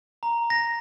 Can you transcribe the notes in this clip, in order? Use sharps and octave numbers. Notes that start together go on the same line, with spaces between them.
A#5
A#6